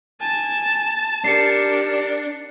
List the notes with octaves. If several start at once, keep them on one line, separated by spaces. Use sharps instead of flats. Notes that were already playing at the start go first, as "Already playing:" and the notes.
G#5 A5
D4 G4 A#4 C7 C#7